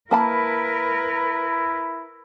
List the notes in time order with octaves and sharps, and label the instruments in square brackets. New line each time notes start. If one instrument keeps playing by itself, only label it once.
[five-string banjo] A#3 A5 B5 [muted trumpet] E4 [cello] A#4 B4